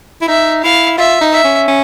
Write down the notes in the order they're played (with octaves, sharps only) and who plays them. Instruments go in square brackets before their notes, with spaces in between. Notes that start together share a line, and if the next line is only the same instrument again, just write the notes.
[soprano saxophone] E4
[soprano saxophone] D#4 [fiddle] E5
[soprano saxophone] E4 [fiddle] F5
[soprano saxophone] F4 [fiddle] E5
[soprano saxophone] D#4
[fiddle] E5
[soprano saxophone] C#4
C#4